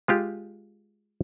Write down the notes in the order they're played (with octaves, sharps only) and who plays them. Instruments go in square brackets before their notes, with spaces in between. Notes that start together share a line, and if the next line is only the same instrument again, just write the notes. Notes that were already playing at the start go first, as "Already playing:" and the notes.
[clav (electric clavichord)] G#3 F4 G4